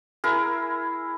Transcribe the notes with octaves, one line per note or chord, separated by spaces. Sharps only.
E4 G#4 A#4